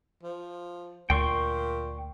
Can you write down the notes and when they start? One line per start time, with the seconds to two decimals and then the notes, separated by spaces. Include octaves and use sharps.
0.23 F3
1.10 D2 A#2 G5 C6 C#6